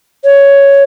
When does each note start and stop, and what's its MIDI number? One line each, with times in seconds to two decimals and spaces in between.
0.24 0.83 73